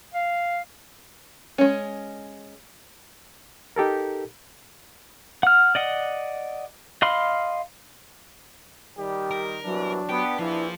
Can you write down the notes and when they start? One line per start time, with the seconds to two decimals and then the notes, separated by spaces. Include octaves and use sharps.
0.14 F5
1.58 G#3 C#4
3.76 D#4 G4 A4 A#4
5.43 F#5 F6
5.75 D5 D#5 F#5
7.02 D#5 F5 B5 C6
8.98 D#3 G3 G4
9.31 A#4
9.65 C2 B2 E3 F#3 D4
10.09 B3 G4
10.39 A#1 E3 F3 E4